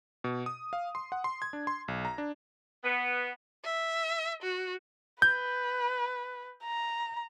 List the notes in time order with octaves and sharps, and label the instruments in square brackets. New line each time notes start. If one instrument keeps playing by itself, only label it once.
[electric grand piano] B2
D#6
F5
C6
F#5
C6
G#6
D4
C6
B1
A#5
D4
[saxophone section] B3
[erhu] E5
F#4
[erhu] B4 [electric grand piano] G6
[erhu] A#5